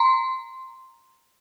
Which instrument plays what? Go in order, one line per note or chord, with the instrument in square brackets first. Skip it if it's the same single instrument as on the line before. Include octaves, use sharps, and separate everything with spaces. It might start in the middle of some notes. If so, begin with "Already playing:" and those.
Already playing: [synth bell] A#5 C6